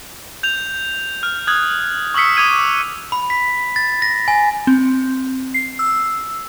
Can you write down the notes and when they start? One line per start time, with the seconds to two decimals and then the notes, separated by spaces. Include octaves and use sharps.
0.43 G6 F7
1.23 F6
1.47 D#6 F6 F#6 G#6
2.14 C#6 D#6 E6 B6 C#7
2.37 D6 D#6 G#6 D#7
3.12 B5
3.30 B6
3.76 A6
4.02 A#6
4.28 G#5
4.67 C4
5.54 C7
5.79 E6